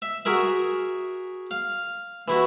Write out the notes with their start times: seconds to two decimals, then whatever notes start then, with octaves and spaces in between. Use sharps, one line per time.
0.02 E5
0.25 F#4 G#4 A#4 E5
1.51 F5
2.28 E3 E4 F#4